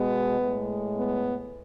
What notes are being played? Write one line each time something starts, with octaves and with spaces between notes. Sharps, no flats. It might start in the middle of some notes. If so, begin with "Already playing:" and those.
Already playing: B2 G#3 B3
A2 G#3
B3